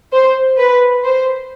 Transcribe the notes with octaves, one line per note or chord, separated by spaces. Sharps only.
C5
B4
C5